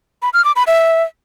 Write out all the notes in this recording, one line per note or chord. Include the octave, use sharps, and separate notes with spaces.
B5
F6
D6
B5
E5